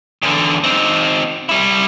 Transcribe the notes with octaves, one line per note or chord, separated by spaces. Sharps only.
E2 D3
C4 D#4
G3 E4